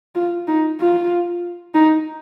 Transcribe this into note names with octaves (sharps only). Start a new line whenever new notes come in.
F4
D#4
F4
D#4